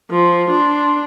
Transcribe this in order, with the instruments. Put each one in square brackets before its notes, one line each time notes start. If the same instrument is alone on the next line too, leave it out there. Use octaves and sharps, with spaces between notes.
[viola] F3 [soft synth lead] C6
[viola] D4